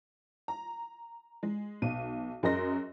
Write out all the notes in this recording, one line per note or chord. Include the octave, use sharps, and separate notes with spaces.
A#5
G#3
B1 D#7
F#2 G#4 A#4 D#5 C6 A#6